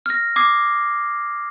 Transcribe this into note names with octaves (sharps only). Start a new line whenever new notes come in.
F6 A#6
D6 D#6 G#6 C7